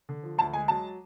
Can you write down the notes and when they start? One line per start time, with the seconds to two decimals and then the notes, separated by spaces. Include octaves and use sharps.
0.09 D3
0.23 F3
0.38 D2 A5
0.53 G#3 G#5
0.68 F#3 A5